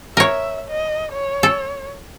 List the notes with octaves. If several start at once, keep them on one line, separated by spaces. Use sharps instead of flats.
A#4 C#5 E5
D#5
C#5
A4